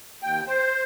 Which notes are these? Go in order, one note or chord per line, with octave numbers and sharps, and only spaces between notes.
D#2 G5
C5